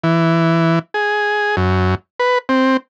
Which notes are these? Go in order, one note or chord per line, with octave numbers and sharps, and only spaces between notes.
E3
G#4
F#2
B4
C4